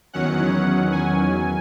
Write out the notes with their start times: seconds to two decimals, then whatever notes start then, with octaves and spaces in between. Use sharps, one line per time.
0.13 E2 D#3 F#3 C#4 F#5
0.92 G#5